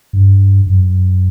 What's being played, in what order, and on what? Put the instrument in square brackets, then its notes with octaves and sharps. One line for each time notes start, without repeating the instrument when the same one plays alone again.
[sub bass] G2
F#2